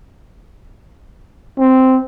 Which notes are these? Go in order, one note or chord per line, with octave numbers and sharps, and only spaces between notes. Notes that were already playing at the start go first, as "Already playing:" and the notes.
C4